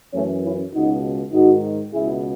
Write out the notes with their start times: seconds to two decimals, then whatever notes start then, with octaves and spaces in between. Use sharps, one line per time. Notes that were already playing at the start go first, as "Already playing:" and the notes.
0.13 F#2 E3 A3 C#4
0.43 C#4 E4
0.73 C#2 B2 D#4 F#4
1.33 G#2 D#3 D#4 F#4
1.93 C#2 B2 E4 G#4